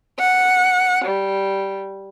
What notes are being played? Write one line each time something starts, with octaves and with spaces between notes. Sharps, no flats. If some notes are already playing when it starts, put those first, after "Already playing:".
F#5
G3